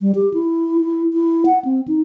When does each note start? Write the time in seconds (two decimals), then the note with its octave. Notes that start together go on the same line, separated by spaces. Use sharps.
0.01 G3
0.15 G4
0.34 E4
0.80 E4
1.14 E4
1.46 F#5
1.65 C4
1.88 D#4